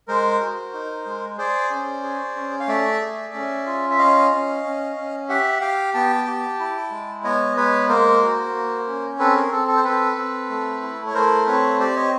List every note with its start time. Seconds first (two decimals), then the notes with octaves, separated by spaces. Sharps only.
0.08 G#3 A#4 C5
0.41 F#4
0.74 D#4
1.06 G#3
1.38 G#4 C5 D5
1.71 C#4
2.03 G#4
2.36 C#4
2.60 F5
2.68 A3 D5 E5
3.01 G#4
3.34 C#4
3.66 F4
3.91 E5
3.98 C#4 D#5 F5
4.32 C#4
4.63 C#4
4.96 C#4
5.29 G4 E5 F#5
5.61 G4 F5 G5
5.94 B3 G5 A5
6.27 G4
6.59 E4
6.91 G#3
7.24 B3 C#5 D#5
7.57 G#3 B4 C#5
7.89 A#3 A#4 C5
8.22 F#4
8.54 A#3
8.87 C#4
9.19 C4 A4 B4
9.36 G#4 A#4
9.52 C4 A4
9.68 A4
9.76 C5
9.84 C4 A4 B4
10.17 C4
10.49 A3
10.82 E4
11.07 C#5
11.14 A3 A#4 C5
11.47 C4 B4 C#5
11.80 G4 C5 D5
11.96 C#5 D#5